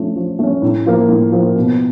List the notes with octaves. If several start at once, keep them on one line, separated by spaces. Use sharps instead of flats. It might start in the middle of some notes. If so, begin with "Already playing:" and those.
Already playing: F3 A3 C#4
F3
A3 C#4
A2
F3 A#3
A2
F3 A#3
B2